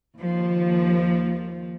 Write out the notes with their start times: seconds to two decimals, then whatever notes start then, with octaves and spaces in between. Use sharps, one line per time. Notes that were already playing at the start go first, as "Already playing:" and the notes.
0.18 D#2 F3